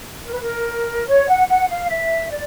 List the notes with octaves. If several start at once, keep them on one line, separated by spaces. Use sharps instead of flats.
A#4
B4
A#4
C#5
F#5
F#5
F5
E5
D5